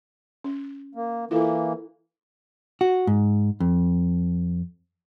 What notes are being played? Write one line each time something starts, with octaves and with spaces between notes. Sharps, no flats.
C#4
A#3
E3 A#3 E4 F4 A4
F#4
G#2
F2